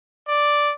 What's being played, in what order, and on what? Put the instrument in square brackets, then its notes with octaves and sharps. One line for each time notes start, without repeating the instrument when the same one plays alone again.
[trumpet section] D5